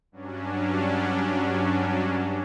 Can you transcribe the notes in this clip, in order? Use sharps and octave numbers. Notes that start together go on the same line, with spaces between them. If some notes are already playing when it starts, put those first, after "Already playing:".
G2 F#3 C#4 D4